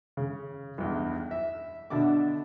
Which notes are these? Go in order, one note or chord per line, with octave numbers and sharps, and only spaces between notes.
C#3
B1 E2 G2
E5
B2 D3 D4 E5 D6